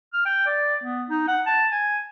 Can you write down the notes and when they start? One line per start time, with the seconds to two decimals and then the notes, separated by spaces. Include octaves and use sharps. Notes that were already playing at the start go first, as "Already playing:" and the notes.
0.13 F6
0.25 G5
0.47 D5
0.84 B3
1.10 D#4
1.28 F#5
1.46 A5
1.72 G#5